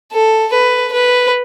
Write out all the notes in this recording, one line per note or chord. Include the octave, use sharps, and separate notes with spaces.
A4
B4
B4